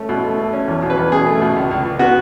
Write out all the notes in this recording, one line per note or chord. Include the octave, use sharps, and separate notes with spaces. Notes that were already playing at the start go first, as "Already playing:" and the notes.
Already playing: A3 C#4
B2
A3
A3
C#4
E2
B2
B4
E2
B2 G#4
A3
B2
C#2
C#2
C#2
B3 F#4